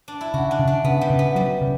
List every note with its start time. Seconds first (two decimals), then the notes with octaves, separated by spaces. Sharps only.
0.08 D4
0.21 E4
0.34 C#3 F#4
0.51 D4
0.59 C#3
0.67 D4
0.84 C#3 B3
1.01 G3
1.10 C#3
1.19 B3
1.35 F#3 G3
1.61 C#3